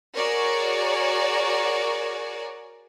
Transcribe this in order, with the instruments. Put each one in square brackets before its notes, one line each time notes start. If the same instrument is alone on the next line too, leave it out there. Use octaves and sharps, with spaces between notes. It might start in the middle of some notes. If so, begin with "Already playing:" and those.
[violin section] F#4 G#4 A#4 C#5 D5